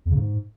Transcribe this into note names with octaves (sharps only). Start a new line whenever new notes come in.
E2
C#3
G#2